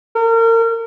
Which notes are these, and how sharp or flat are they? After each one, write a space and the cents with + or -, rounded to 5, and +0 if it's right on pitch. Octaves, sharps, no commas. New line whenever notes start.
A#4 -35